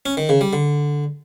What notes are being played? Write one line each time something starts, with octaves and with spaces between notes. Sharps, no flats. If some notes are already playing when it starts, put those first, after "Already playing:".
C#4
D#3
C#3
G3
D3